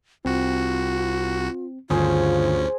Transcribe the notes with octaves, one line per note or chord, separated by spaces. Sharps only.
C2 C4 F4 F#4
D2 G2 D3 D#3 C#4 F4 G#4 C5